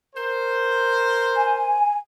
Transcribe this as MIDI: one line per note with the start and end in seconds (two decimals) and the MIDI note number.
0.15 1.86 70
0.15 1.86 72
1.36 1.98 80